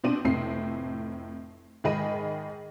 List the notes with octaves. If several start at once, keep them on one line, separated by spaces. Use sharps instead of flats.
B2 C4 D4 D#7
F1 A2 C4 C7
G#2 D#3 G#4 D#5 B5 D#7